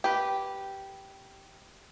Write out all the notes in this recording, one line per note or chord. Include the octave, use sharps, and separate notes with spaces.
G4 B4